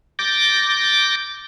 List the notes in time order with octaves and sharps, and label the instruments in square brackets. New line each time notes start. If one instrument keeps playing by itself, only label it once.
[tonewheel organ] D6 G6 A6 A#6